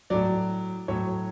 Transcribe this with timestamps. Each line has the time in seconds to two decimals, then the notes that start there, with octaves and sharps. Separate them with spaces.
0.10 A2 F#3 D5
0.88 A2 F#3 C#5